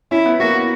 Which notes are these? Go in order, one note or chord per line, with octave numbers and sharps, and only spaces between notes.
C#4 E4
B3
A#3 F#4